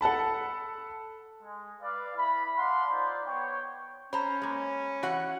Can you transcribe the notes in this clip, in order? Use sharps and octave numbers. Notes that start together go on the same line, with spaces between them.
A4 F#5 A5 B5
G#3
B4 D5 F5
E4 B5
D5 F5 F#5 A5 B5 C6
D#4 F4 C5 D5
B3 C#5 G5
C#4 C5 A#5 B5
G#3 A#3
E3 F#4 F#5